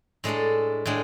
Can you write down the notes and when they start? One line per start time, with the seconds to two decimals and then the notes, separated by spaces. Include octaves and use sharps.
0.24 A2 G#3 D4 A4
0.86 A2 G#3 D4